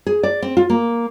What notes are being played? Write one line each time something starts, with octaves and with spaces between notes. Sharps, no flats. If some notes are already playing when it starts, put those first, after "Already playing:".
G#4
D5
C4
F4
A#3